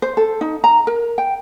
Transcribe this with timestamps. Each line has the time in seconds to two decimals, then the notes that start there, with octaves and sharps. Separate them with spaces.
0.02 C5
0.17 A4
0.41 D#4
0.64 A#5
0.87 A#4
1.18 G5